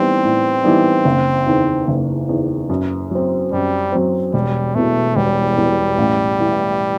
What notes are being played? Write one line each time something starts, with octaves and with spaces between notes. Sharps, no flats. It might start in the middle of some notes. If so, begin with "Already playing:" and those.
Already playing: A2 E3 G3 B3 C4 D#4
A2
E3 G3 B3 D#4
F#1
E2 D#3
F#1
E2 D#3
F#2
F#3 C4
F#2 G3
F#3 C4
E1 G3
E2 B2 A3
E1 G3
E2 B2
A1
A2 E3